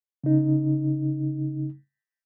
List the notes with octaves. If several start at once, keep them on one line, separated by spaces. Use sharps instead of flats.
C#3 D#4